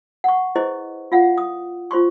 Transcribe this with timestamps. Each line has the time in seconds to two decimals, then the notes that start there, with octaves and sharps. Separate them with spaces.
0.24 F#5 C#6
0.55 E4 G#4 B4 C5 D#5 C#6
1.12 F4 F5 F#5
1.38 D#6
1.91 F4 C5 C6 C#6